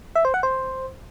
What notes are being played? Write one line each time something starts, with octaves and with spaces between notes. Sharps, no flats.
E5
C5
F#5
C5